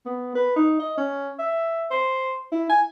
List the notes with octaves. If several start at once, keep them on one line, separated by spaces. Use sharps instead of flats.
B3
B4
D#4
D#5
C#4
E5
C5
E4
G#5